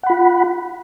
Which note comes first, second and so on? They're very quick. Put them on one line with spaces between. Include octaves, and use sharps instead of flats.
F#5 B5 F4